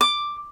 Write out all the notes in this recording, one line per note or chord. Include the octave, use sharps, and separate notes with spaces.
D6